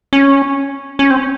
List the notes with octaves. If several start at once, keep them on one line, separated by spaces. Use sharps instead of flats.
C#4
C#4
C4